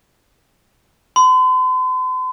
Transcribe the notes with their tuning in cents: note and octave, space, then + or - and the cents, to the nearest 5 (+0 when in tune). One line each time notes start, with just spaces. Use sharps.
C6 -45